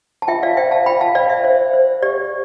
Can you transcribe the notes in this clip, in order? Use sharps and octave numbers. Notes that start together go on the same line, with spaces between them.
A5
F4 E5 G5
D5 F5
C5 E5 G5
F5 A5
F4 G5 B5
F5 A5
C5 D5 F5
E5
C5 D5
C5
G4 D5